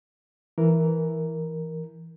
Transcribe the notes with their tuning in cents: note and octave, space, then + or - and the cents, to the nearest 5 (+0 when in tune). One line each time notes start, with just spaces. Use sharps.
E3 +0 A#4 +0